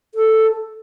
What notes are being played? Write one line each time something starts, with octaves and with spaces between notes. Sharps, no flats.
A4